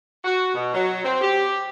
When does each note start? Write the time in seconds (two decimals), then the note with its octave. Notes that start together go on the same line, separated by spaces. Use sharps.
0.24 F#4
0.54 B2
0.74 F#3
1.03 C4
1.21 G4